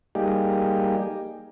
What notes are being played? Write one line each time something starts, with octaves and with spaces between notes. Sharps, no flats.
G3 A#3 D#4 G4 G#4